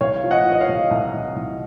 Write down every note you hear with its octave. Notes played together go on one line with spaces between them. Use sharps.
C2 C#5 F5
F3
D#5 F#5
F3
D#5
C#5 F5
C2
C2
C2
C2